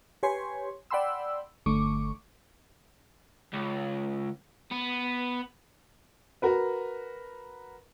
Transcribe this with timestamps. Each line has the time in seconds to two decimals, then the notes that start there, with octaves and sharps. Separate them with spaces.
0.23 G4 B4 C#5 G#5 C6
0.91 D5 F#5 G5 B5 C6 E6
1.66 G1 D3 A3 C#6 D6
3.53 C#2
4.71 B3
6.42 F#4 A#4 B4